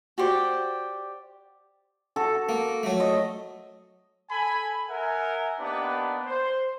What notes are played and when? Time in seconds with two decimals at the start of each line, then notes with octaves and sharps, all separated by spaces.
0.18 F#4 G4 C5 D5
2.16 F#4 A4
2.49 A#3
2.83 F#3 A3
3.00 D#5
4.31 A4 G#5 B5
4.89 A#4 E5 F#5 G#5
5.60 A#3 B3 D4 D#4 G4 B4
6.26 C5